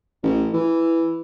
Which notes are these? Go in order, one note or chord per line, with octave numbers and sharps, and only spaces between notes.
A1
E3